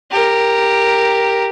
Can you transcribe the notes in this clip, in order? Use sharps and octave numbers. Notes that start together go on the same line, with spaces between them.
G4 A#4